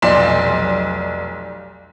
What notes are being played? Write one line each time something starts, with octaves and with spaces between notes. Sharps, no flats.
F1 B1 D5 C6 E7